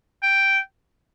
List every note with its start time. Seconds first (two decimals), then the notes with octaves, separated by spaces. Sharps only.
0.23 G5